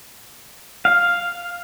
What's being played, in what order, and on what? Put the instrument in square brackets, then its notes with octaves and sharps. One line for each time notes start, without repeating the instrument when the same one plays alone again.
[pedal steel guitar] F5